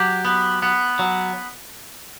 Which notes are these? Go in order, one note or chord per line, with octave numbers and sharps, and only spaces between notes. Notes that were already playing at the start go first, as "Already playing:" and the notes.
Already playing: F#3 G4
B3
B3
F#3